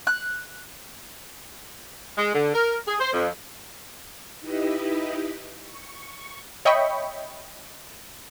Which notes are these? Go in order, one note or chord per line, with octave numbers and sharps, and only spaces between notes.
F#6
G#3
D3
A#4
G#4
C5
F2
D#4 E4 G4 B4 D#5 E5
C#6
C#5 D#5 E5 G5 B5 C#6